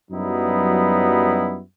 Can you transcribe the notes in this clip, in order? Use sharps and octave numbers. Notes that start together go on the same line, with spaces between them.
F#2 F#3 G3 B3 D#4 E4